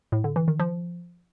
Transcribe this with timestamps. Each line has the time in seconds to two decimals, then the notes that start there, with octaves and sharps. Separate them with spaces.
0.12 A2
0.24 D3
0.36 E3
0.48 D#3
0.60 F3